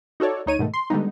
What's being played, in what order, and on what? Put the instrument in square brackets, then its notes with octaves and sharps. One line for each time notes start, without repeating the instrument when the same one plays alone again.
[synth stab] D#4 F#4 A4 C#5 D5
D2 D#4 C#5 D#7
G#2 B2 D#3 A3
C6
D3 G3 G#3 B3 D#4